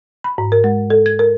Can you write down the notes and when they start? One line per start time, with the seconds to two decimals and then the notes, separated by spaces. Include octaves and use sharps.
0.24 B5
0.38 G#2
0.52 A#4
0.64 G#3
0.90 A4
1.06 G#6
1.19 A#4